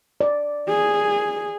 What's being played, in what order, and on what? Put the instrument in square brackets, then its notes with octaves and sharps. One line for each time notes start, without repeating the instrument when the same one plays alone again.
[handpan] D5
[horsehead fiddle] G#4